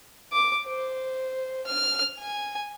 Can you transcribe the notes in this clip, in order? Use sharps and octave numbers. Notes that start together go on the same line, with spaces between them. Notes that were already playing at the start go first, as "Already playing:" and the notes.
D6
C5
F6
G#5